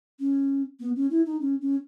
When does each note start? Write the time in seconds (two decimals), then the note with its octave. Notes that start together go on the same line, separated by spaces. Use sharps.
0.20 C#4
0.80 B3
0.96 C#4
1.11 E4
1.26 D#4
1.41 C#4
1.61 C#4